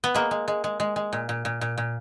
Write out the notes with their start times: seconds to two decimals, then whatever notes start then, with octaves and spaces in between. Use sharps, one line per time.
0.04 B3
0.14 G#3 A#3
0.31 G#3
0.48 G#3
0.64 G#3
0.80 G#3
0.96 G#3
1.13 A#2
1.29 A#2
1.45 A#2
1.61 A#2
1.78 A#2